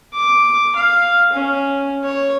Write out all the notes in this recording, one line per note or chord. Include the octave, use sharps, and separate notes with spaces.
D6
F5
C#4
C#5